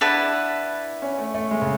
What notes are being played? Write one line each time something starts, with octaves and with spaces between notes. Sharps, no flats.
D4 E4 B4 F#5 A5
C#4
A3
A3
G#3
C#3